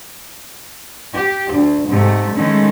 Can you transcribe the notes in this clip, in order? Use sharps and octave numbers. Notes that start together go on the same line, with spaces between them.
G4
D2
G#2 C3 A3
D#3 G#3 A3 C#4